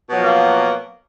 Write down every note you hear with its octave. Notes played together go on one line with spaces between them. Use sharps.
B2 F3 F#3 A#3